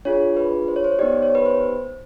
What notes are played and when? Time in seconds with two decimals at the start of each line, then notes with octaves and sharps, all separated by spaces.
0.05 D4 F4 G#4 C#5
0.37 B4
0.68 C5
0.76 C#5
0.84 C5
0.92 C#5
0.99 B3 D#4 G4 D5
1.13 C5
1.22 C#5
1.35 B4
1.46 C5